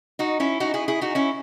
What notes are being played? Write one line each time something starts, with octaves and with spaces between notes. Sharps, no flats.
D#4 F#4
C#4 E4
D#4 F#4
E4 G#4
E4 G#4
D#4 F#4
C#4 E4